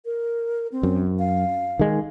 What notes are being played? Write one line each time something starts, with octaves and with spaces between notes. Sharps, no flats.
A#4
C4
F#2
F5
D#3 G#3